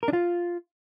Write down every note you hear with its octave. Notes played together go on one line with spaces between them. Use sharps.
A#4
D4
F4